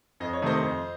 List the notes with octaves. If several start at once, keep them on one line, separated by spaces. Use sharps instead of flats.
F2 D#5
C#5
C3 D#3 A3 C5 D#5
F2